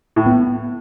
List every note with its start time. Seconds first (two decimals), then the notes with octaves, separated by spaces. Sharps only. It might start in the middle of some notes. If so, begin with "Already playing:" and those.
0.16 A2
0.26 B3